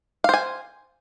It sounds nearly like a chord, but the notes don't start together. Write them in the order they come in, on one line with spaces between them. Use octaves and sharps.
F5 C5 G#5